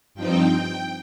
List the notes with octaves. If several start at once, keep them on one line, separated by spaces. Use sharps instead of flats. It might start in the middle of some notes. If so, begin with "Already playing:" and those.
G2 F3 C4 D#4 G5